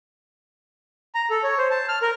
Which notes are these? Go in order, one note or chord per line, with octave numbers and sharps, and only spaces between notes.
A#5
A4
C#5
C5
A5
F6
A#4